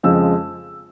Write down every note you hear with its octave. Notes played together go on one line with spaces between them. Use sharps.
F2 C#3 F3 G#3 E6